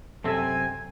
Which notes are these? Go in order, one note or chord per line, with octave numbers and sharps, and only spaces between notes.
F#2 C3 C4 A4 E5 G#5